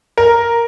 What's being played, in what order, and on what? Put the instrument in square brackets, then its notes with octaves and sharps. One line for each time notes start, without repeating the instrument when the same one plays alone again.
[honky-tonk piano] A#4